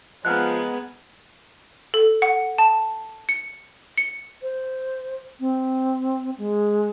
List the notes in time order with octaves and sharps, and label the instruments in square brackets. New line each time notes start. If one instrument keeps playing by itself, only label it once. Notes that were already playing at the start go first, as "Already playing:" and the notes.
[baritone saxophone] F3 [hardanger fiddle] G#3 B3 [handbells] D#5 F#5 A#5 [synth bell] F6 F#6
[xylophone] A4
F#5
A5
C#7
C#7
[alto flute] C5
C4
G#3